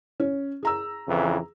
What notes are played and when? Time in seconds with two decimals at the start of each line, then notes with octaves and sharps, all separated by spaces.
0.20 C#4
0.63 G#4 A#5 E6
1.08 F2 C#3 E3